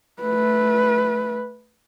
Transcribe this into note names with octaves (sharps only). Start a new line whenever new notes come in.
A3 B4